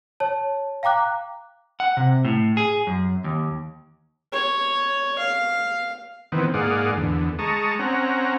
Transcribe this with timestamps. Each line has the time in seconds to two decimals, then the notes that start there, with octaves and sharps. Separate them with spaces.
0.20 C#5 A5
0.83 F5 G5 A#5 D6 F#6
1.80 F#5
1.97 C3
2.25 A2
2.57 G#4
2.87 F#2
3.24 D#2
4.32 C#5
5.19 F5
6.32 D#3 E3 B3 C4
6.54 G#2 A#3 G#4 D5 F5 F#5
6.97 E2 D3
7.39 G#3 A5 A#5 C#6 D#6
7.79 C4 C#4 F#5 A#5